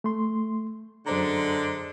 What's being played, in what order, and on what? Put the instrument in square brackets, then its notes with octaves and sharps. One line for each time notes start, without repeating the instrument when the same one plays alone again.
[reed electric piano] A3 C6
[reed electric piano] F#2 C5 A#5 [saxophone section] D3 G#3 D4